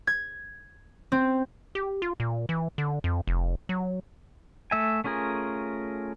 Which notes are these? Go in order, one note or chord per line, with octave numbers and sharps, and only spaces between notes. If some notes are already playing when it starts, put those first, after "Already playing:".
G#6
C4
G4
F4
A#2
E3
D3
F2
F1
F#3
A3 E5 G#5
A3 C#4 F4 G#4 A#4